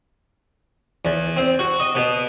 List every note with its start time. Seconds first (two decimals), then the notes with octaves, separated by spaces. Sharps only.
1.05 E2
1.37 C4
1.59 F#4
1.80 D#5
1.95 B2